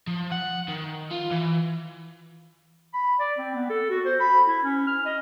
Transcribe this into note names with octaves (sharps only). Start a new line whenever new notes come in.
F3
F#5
D#3
F4
E3
B5
D5
C4
B3
A4
F#4
C5
B5
E4
C#4
F6
D#5